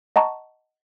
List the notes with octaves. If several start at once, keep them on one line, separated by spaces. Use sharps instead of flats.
D#5 F#5 A5 A#5 C#6